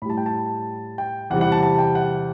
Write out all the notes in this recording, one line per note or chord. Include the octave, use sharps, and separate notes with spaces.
A2 G3 A5 B5
G5
A5
G5
E2 C3 G3 F#5
F#5
A5
A5
G5
F#5